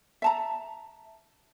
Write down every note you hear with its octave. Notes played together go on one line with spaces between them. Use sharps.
E5 A5 A#5